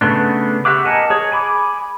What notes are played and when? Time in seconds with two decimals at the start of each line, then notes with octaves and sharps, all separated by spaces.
0.01 C#3 A3 B3 D4
0.65 F#4 G4 E5 F#5 D6
0.85 A#4 D#5 F#5 G#5 A5
1.10 G#4 C#5
1.32 G#5 B5 D6